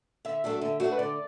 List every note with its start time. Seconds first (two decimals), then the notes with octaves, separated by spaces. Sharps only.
0.25 D3 E5
0.44 F#3 A3 D4 F#4
0.61 D3
0.80 F#3 A3 D4 F#4
0.92 B4
0.98 D3 D5